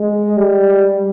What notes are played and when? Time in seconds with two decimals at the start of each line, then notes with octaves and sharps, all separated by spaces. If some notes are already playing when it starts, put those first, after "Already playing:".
Already playing: G#3
0.37 G3